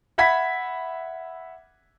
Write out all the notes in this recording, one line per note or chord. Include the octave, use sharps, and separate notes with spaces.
E5 F#5 B5 G#6 B6